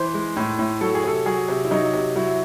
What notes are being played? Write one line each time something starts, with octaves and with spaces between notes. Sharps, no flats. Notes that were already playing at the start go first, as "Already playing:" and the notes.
Already playing: E3 C5
G#3
A2
A2
F#3 A4
G#4
C3 A4
F#3 G#4
C3
E4
F#3 D#4
C3
F#3 E4